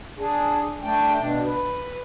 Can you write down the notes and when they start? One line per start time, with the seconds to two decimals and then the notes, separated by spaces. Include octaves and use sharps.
0.19 D4 G#4
0.83 A3 D4 G5
1.18 B2 D4
1.46 B4